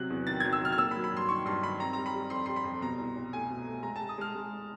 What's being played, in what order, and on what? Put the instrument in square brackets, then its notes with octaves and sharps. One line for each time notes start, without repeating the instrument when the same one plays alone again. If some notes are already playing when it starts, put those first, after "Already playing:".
Already playing: [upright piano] C3 F#3 F#6
E2
D#3 A6
F#3 G#6
E6
D#3 F6
F6
A#3 E6
B5
F#3
B5
G2 C6
D#3 C#6
G2 C6
D#3 B5
C4 A#5
G3 A#5
B5
G3
F2 C6
G3 C6
B5
F2
B2 A#5
C2
C2
A3 G#5
B2
A3
G#3 A#5
A5
G#3
D#6
G#3 F6
G#3